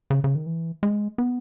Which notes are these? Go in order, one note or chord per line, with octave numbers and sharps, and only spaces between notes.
C#3
C#3
D#3
E3
G#3
B3